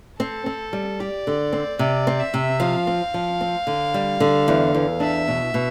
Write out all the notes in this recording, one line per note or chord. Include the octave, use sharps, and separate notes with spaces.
C4 A4
C4
G3
G4 D5
D3
C4
C3 D5
C4
E5
C3
F3 F5
C4
F3
C4
D3
G3
D3
E2
E2
D4 E5
B2
B2